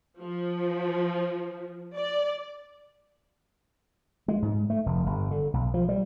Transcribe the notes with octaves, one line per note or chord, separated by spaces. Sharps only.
F3
D5
G#3
G#2
A3
F1
G1
D3
B1
F3
G3